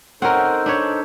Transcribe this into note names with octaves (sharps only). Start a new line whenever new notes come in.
C4 C#4 D#4 A4 A#4 C5 F#5
D4 B4 C#5